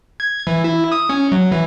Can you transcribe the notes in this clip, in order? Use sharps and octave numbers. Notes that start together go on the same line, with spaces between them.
G#6
E3
E4
D#6
C#4
F#3
E3